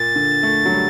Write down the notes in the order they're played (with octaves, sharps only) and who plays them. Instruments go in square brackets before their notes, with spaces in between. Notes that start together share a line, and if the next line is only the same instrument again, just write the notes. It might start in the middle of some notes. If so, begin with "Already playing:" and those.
Already playing: [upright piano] A#2 [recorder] A6
[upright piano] D3
A3
F#3
G3